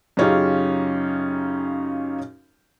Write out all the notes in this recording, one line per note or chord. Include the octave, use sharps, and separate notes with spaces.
F#2 C#3 C#4 D#4 F4 G4